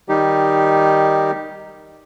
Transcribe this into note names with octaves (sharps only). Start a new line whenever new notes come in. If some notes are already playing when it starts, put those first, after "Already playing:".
D#3 G3 D#4 G4